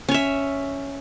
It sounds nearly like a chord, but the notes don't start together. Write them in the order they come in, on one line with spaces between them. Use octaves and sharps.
C#4 C#5 E5